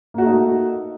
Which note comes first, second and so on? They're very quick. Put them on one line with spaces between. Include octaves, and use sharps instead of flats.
A#3 F#4 A3 D#4